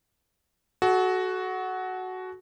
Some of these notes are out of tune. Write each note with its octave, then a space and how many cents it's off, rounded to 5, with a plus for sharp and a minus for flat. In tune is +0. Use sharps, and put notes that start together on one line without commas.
F#4 +5 A4 -40